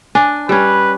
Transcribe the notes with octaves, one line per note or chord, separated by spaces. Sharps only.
D4 G#5
G3 C#4 B4